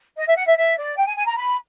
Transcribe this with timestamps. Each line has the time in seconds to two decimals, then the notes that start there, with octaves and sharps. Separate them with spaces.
0.17 D#5
0.27 E5
0.36 F#5
0.47 E5
0.57 E5
0.77 D5
0.97 G5
1.07 G#5
1.17 G#5
1.26 A#5
1.38 B5